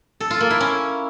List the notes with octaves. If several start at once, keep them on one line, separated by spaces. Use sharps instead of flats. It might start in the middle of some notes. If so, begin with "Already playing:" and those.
A4
F4
A#3
E4
C#4